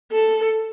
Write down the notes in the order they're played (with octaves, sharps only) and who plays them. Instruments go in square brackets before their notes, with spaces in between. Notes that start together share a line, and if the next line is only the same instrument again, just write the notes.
[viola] A4